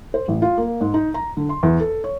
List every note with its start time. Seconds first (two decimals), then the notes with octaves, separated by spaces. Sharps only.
0.14 C5
0.28 A1
0.42 F4
0.58 A#3
0.81 G#2
0.94 D#4
1.14 A#5
1.37 D3
1.49 C6
1.63 E2
1.80 A4
2.04 C#5